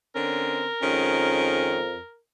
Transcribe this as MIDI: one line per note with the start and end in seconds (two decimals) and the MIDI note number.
0.16 0.66 50
0.16 0.66 60
0.16 0.66 61
0.16 2.20 70
0.82 2.00 41
0.82 1.80 51
0.82 1.80 56
0.82 1.80 61